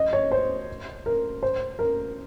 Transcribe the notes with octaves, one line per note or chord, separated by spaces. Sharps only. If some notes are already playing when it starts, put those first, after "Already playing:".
Already playing: D#5
C#5
C5
A#4
C5
A#4